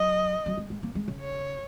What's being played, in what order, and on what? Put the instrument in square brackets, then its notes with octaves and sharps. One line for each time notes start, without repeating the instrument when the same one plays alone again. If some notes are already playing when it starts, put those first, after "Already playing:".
Already playing: [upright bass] F#3 [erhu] D#5
[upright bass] F#3
G#3
G#3
A#3
G#3
C#3
[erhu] C#5